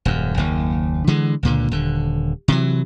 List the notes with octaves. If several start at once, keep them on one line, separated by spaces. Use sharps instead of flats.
D#1 F#2
F#1 D#2
D3 E3 G#3
C#2 A#2 D3
D#1 D3
C3 E3 F#3